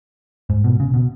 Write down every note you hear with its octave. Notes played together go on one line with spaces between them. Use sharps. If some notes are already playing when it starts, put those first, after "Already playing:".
G#2
B2
C#3
B2